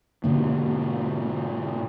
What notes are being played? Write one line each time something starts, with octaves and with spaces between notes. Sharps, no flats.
G#2 B2 D3 A#3